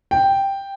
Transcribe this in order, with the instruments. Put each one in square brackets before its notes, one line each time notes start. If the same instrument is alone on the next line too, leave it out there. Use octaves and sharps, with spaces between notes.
[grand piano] G5